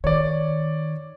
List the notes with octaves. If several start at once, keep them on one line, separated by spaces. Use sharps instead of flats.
D#3 C#5 D5